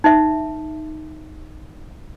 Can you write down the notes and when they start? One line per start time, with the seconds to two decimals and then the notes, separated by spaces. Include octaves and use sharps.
0.04 D#4 E5